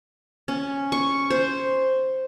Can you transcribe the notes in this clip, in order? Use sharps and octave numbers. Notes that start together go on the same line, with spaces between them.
C#4
C#6
C5